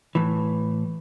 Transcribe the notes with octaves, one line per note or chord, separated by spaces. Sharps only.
A2 E3